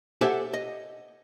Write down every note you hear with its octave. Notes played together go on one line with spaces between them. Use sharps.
G4 A4 C5 E5 F#5 G#5
D#5